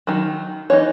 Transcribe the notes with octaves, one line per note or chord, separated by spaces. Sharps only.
D#3 F#3
E3 B3 D#4 C#5